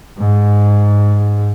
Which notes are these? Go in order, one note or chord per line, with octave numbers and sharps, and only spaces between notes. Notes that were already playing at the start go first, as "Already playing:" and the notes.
G#2